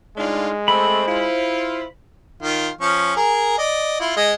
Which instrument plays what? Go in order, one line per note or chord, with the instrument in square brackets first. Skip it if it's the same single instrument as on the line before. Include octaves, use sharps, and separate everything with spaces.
[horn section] A2 D4 F4 [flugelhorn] G#3 [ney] D#4
[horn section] A3 C4 [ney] C5 [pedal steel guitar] B5
[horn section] E4 F4
[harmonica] D#3 F4
F3 C#4 C#6
G#4 A#4
D5 D#5
E4 F4
G#3 D#5